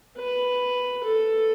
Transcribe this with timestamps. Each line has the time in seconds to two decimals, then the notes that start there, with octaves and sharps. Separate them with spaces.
0.17 B4
1.05 A4